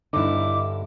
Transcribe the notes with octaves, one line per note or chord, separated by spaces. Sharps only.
G2 D3 D#4 E4 D6